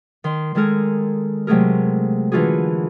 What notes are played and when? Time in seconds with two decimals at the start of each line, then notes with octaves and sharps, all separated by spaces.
0.24 D#3 C6
0.55 D#3 G#3 A4 A#4 G#5
1.47 C3 F#3 G#3 A3 G#4 A#4
2.32 D3 E3 D4 F4 F#4 G#4